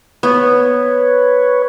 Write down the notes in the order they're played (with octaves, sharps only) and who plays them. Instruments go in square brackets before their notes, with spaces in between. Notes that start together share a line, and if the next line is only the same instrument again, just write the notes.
[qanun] B3 [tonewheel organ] B4 C#5